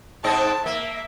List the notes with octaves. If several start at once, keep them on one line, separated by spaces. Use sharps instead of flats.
G#2 C4 D#5 A5
A#3 E5